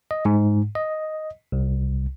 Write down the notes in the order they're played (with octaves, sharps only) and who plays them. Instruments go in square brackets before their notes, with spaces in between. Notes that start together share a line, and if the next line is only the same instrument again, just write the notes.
[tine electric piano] D#5
G#2
D#5
C2